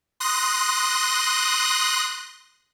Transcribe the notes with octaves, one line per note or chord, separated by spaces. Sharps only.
C6 D#6 F#6 A#6